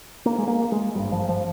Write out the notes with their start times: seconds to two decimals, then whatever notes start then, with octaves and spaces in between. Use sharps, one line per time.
0.26 A#3
0.38 G#3
0.48 A#3
0.72 G#3
0.95 G#1 G2 G3
1.12 F3
1.29 F3